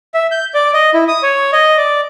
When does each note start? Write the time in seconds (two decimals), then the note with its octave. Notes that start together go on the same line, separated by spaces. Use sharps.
0.14 E5
0.31 G6
0.54 D5
0.74 D#5
0.94 E4
1.08 D#6
1.23 C#5
1.53 D#5
1.77 D5